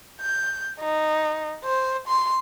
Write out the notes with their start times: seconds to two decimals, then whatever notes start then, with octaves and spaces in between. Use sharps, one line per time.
0.21 G6
0.79 D#4
1.64 C5
2.08 C6